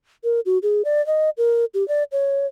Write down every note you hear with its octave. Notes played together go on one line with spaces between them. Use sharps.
A#4
F#4
G#4
D5
D#5
A#4
G4
D5
C#5